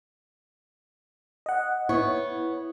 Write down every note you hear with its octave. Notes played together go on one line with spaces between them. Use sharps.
D#5 F#5
B3 E4 C#5